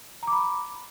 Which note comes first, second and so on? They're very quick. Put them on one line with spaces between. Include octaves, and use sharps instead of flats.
A#5 D6 B5